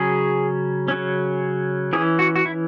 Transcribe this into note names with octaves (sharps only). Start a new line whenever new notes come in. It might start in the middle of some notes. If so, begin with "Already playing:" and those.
Already playing: C#3 F#3 C#4 G#4
C#3 F#3 C#4
E3 C#4 G#4
F#4
F#4
E4